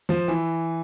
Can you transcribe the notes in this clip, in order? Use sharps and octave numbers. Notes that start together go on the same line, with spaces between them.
F3
E3